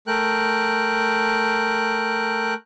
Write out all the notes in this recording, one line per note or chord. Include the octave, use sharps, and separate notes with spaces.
A3 A#4 G5 F#6